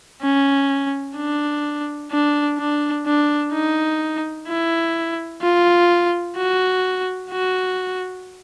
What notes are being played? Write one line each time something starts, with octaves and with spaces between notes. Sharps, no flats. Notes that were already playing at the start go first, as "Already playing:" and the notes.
C#4
D4
D4
D4
D4
D#4
E4
F4
F#4
F#4